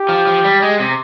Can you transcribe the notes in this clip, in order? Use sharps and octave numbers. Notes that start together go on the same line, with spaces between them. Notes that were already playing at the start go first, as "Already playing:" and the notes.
Already playing: G4
F3
F3
G3
G#3
C3